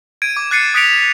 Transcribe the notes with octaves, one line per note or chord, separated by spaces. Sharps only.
G#6 D7 D#7
D6
D6 F#6 A6 C7 C#7 D#7
D#6 F#6 B6 C#7 D7 F7
F7